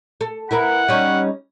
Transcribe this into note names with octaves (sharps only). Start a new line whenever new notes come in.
A4
E4 A#4 B4 F#5
G3 C#4 D#4